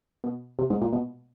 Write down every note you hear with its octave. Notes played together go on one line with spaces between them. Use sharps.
B2
C3
G#2
A#2
B2